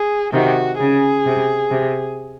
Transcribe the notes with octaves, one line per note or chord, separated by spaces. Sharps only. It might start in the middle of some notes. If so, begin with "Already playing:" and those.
Already playing: G#4
C3 D#3 F#4
C#3 G#4
C3
C3